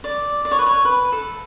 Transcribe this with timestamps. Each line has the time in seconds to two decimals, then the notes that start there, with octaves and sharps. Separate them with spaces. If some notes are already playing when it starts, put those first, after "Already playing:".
0.04 D5
0.45 D5
0.51 C#5
0.59 B4
0.66 C#5
0.85 B4
1.12 A4